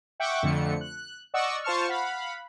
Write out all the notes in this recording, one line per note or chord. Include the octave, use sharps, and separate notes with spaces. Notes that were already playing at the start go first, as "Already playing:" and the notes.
E5 F#5 G5 C#6 D6
F2 D3 A3 C#7
F#6
D5 D#5 F#5 C#6 E6
F4 C5 A5 C#6 F6
F5 F#5 B5